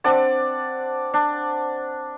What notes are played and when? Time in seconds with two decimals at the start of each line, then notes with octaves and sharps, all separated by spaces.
0.04 C4 D4 D5 F#5
1.14 D4